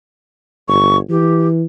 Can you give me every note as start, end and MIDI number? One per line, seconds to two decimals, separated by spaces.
0.68 0.99 31
0.68 0.97 85
1.10 1.64 52
1.10 1.47 67